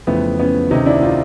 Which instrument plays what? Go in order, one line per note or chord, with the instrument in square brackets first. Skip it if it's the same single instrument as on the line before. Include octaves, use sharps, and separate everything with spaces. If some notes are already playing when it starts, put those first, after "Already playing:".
[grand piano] F2 C#3 E3 A3 B3
B3 C#4
D2 C3 D#3 C#4 D#4
D4 E4
D#4 F4